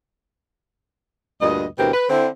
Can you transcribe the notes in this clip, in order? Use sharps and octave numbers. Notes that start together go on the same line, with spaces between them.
D2 G2 A#2 D#5
D2 B2 E3 C4 G4 A#4
B4
D3 C4 E4